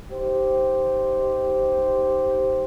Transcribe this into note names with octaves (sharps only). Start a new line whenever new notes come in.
D#4 G4 C5